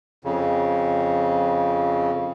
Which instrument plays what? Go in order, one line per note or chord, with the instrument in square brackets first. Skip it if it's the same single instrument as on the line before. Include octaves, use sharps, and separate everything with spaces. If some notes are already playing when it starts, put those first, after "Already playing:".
[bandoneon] F2 C#3